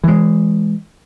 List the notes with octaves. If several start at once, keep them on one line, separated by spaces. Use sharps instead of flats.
E3 G#3